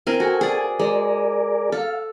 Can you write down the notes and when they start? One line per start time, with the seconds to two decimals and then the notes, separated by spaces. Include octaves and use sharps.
0.07 C4 E4 A#4 G#5
0.20 F#4 A4 G#5
0.41 G#4 D5
0.79 G#3 G#4 A#4 D5
1.72 A4 F5